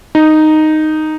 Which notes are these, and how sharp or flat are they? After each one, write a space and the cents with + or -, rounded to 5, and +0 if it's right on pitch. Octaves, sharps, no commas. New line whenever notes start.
D#4 -5